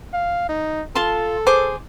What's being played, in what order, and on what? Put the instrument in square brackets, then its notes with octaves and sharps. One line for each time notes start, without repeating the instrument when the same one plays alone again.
[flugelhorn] F5
D#4
[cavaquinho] F4 A5 C6 [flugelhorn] A4
[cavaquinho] G#4 C5 D6